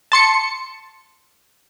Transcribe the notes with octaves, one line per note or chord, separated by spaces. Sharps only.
A5 C6 C#7